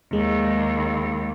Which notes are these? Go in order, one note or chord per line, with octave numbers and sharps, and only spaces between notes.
D#2 G#3